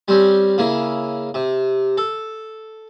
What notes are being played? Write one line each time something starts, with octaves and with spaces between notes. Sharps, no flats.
G3 C4 C#4
C#3 A#3 E4
C3
A4